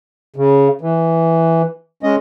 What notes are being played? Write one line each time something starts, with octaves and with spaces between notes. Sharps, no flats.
C#3
E3
G#3 C#4 D#5